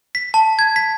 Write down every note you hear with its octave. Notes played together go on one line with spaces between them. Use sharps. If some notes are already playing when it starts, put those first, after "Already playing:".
B6
A5
G#6
B6